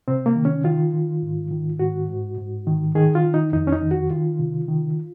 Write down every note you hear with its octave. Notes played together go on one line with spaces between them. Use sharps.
C3 C4
A#3
D#3
C#4
D#3 F4
D#3
G#2
D#3
G#2 F#4
G#2
G#2
D#3
D#3 G#4
F4
D#3
D#4
F2 D#4
C#4
D#4
D#3
F#4
D#3 F4
C3
D#3